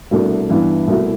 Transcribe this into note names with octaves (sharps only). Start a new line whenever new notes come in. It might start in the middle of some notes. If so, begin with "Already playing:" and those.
C2 B2 A3 D4
G2 E3 B3 E4
C2 B2 A3 E4